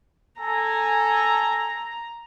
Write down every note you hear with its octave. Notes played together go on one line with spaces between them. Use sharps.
A4 G#5 A#5